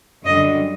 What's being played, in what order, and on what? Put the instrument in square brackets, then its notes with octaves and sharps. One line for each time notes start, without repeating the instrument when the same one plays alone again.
[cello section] F#2 D3 G3 D#5